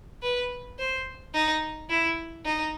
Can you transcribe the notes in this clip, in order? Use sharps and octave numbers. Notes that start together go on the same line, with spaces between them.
B4
C5
D#4
E4
D#4